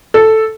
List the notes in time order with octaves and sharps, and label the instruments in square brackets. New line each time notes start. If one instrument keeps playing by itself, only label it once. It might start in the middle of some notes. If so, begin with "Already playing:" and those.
[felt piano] A4